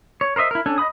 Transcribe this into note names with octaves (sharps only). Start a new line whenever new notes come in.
C#5
A#4 C5 D#5 E5
E4 A#4
C#4 D4 A4 G#5
D#5 F#5 B5 D#6